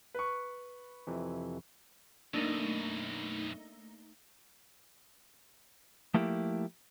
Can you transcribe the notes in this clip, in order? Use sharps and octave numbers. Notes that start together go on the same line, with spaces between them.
B4 C#6
F2 C3 E3
F#2 B2 A3 A#3 D4 D#4
F3 A3 A#3 E4 G4